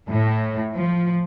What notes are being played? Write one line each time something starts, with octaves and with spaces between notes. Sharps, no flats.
A2
F3